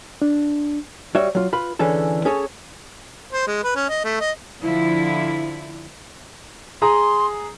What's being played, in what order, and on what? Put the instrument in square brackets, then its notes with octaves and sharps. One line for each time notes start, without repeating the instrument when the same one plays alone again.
[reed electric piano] D4
[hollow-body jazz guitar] G3 F#4 C#5 E5
F#3 F4
F4 B4 B5
D3 E3 C#4 G#4 A4
C#4 G#4 A4 C#5
[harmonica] C5
G#3
B4
C#4
D#5
A3
D#5
[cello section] D3 F3 E4
[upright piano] G#4 A#5 D#6 [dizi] C6